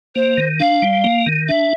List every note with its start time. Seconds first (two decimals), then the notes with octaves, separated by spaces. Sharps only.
0.15 A#3 C5
0.37 D#3
0.60 D4 F5
0.82 G3
1.04 A#3
1.26 D#3
1.48 D4 E5